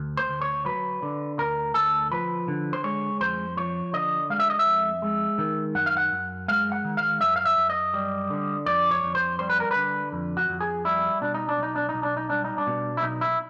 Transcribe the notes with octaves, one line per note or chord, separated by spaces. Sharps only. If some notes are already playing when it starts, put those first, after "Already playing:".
Already playing: D2
C5
D2
C#5
F#3 B4
D3
D2 A#4
D2 A4
F3 B4
D3
C5
G#3 C#5
F2 C5
F3 C#5
D3 D#5
G#3 F5
E5
D#5
E5
F2
G#3
D#3
F#2 F#5
F5
F#5
F#2
G#3 F5
F#5
D#3
F5
F#2 E5
F5
E5
F#2
D#5
G3
D3
F2 D5
C#5
F2
C5
G3 C5
B4
A#4
D3 B4
F2
F#4
F2
G#4
G3 E4
B2 D4
D#4
D4
B1 D#4
D4
B1 D#4
D4
D#4
G3 D4
D#4
D4
B2
E4
B1 D#4
E4